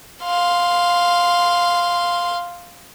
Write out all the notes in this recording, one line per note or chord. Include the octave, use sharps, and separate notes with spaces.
F5 C6